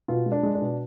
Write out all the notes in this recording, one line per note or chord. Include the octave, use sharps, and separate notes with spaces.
B2 F4
G#3
D4
G#3
D4
B2